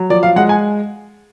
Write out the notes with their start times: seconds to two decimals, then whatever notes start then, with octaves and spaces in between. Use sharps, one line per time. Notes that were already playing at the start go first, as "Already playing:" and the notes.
Already playing: F#3
0.10 F3 D5
0.23 F5
0.36 G#3 F#5
0.49 G#5